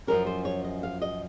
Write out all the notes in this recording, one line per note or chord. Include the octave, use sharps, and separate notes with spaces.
F#2 F3 G#3 C#4 A#4
C5
C#5
D#5
F5
D#5